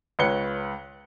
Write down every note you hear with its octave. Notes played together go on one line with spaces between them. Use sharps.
C#2 B4 C#5 C#7 G7